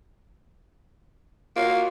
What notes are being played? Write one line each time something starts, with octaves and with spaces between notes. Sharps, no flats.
A#3 F4 F#4 C#5